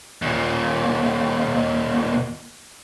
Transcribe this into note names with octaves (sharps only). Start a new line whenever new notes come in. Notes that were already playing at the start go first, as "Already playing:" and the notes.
D#2 A#2